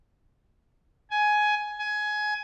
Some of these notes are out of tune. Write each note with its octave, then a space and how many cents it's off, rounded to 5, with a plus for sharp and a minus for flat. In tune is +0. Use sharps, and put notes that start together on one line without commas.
G#5 +15
G#5 +20